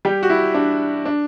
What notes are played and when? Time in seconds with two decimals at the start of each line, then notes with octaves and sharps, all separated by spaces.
0.05 G3 G4
0.23 F#4
0.30 E4
0.54 D4
1.05 D4